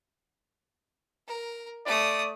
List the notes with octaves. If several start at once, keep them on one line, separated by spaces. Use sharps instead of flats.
A#4
A3 D5 D#6